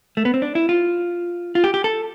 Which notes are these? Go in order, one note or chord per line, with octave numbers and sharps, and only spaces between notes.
A3
B3
C4
D4
E4
F4
F4
G4
G4
A4